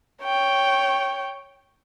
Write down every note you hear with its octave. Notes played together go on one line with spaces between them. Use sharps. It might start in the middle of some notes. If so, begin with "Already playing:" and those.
C#5 G5